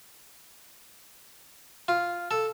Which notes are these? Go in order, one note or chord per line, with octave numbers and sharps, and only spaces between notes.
F4
A4